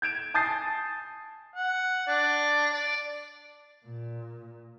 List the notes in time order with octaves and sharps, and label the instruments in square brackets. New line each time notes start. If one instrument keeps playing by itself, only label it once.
[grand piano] G6 G#6 D7 E7
G#5 A5 D#6 G6 A6 C7
[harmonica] F#5
D4
D5
[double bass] A#2